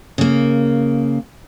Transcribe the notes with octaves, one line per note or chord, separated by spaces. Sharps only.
C#3 A#3